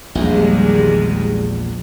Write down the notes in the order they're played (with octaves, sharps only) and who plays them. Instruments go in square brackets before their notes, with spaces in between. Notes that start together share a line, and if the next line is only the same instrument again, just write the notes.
[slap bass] A#1 E2 [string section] D#3 G3 G#3